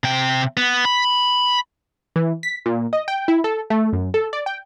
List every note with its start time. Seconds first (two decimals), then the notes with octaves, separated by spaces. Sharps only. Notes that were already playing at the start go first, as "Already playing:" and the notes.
0.04 C3 G5
0.57 B3
0.85 B5
2.16 E3
2.43 B6
2.66 A#2
2.93 D#5
3.08 G5
3.28 E4
3.44 A4
3.70 A3
3.93 F#2
4.14 A4
4.33 D5
4.46 G5